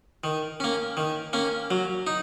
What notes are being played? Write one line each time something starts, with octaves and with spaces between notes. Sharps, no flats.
D#3
A#3 C#4
D#3
A#3 C#4
F#3
D#4